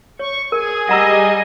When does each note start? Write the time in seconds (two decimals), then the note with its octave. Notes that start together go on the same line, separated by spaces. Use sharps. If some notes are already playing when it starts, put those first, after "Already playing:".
0.19 C#5 C#6
0.52 G#4 A#4 G#5
0.89 G3 D#5 F#5 A#5 E6